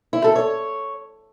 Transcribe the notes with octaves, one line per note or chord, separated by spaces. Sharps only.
E4
A4
C#5